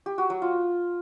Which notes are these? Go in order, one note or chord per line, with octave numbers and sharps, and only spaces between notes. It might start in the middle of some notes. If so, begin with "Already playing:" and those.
G4
F#4
F#3
F4